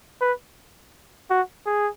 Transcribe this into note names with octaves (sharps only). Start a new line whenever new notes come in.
B4
F#4
G#4